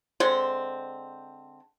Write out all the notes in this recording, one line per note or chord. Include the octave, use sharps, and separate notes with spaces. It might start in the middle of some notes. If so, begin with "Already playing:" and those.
D3 G#3 C4 C5